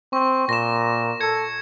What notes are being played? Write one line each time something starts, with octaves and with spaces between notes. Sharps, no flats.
C4 C#6
A#2 A#6 E7
A4 G#6 C#7